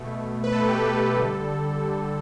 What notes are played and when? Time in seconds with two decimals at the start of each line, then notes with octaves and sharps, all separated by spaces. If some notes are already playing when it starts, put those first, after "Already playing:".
Already playing: B2 A3
0.44 B4
0.52 B2 A3 A4
0.68 G4
0.84 G4
1.00 G4
1.16 D3 G3 A4
1.81 D3 G3